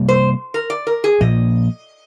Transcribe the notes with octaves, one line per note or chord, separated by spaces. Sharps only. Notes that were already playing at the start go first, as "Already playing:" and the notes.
Already playing: C3 G3 A#3
C5
A#4
D5
A#4
G#4
A#2 F3 A#3 D#5